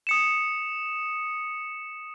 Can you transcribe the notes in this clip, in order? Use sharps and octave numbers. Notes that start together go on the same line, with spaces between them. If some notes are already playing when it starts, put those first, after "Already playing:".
D#6 C#7 E7